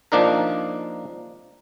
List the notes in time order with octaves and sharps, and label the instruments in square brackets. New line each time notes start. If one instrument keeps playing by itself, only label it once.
[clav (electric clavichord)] F3 A#3 D4 D#4 A#4